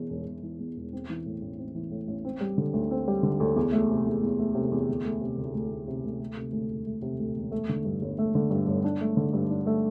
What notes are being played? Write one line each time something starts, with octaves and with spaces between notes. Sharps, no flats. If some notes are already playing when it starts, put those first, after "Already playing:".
Already playing: E1 E2 E3
E1
E1
E3
E2
E1
C4
E3
A2
A1
C4
E3
A2
A1
C4
G3
D3
D2
C4
G3
D3
D2
E2
A3
C3
E2
E2
A3
C3
E2
D2
A3
C3
D2
D2
A3
C3
D2
A3
C3
D2
E1
A3
C3
D2
E1
A3
D3
G2
G1
A3
D3
G2
G1
D4
A3
D3
G2
D4
A3